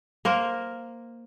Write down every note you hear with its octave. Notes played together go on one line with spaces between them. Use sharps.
A#3 A#4 C5